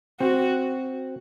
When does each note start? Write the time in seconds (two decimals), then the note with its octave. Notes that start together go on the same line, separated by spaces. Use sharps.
0.20 C4 F#4